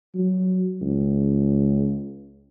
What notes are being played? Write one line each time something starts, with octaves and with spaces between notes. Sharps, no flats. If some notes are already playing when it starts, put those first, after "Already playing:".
F#3
C#2